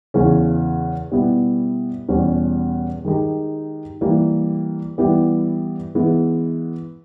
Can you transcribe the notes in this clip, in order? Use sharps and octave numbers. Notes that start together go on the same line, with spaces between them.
E2 C#3 E3 G#3 C#4
B2 G3 B3 E4
E2 B2 G3 C#4
D#3 G#3 D#4 G4
E3 G3 A#3
E3 G3 B3 E4 G4
E3 G#3 B3